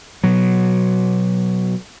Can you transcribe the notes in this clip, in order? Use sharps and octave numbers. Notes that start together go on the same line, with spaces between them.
B2 F#3